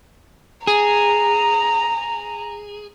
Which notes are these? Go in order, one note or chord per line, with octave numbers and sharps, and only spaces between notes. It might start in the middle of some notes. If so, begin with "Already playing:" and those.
G#4 A#5